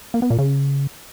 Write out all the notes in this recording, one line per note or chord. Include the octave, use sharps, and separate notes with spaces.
A#3
B3
A#2
C#3